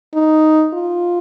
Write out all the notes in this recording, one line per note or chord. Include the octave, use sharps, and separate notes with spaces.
D#4
F4